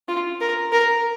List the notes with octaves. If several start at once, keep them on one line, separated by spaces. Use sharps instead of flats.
F4
A#4
A#4